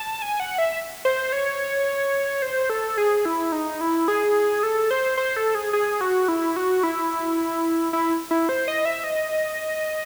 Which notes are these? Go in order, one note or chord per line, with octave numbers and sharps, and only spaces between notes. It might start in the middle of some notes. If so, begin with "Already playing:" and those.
Already playing: A5
G#5
F#5
E5
C5
C#5
C5
A4
G#4
E4
D#4
E4
G#4
A4
C5
C5
A4
G#4
G#4
F#4
E4
F#4
E4
E4
E4
C5
D#5
E5
D#5